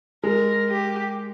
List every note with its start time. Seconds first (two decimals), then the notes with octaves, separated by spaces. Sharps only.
0.24 G#3 A#4
0.69 G4